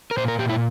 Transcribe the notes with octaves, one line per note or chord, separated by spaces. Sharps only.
A#4
A#2 C5
A#4
A#2 G4
E4